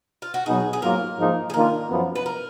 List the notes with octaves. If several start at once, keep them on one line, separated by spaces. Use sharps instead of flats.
F4
F#4
B2 F#3 B3 D#4 G#4
G#4
G#2 F#3 A#3 F4 A#4
G#2 F3 A#3 D#4
G#4
D#3 A#3 D4 F4 A#4
F#2 F3 B3
B4
A#4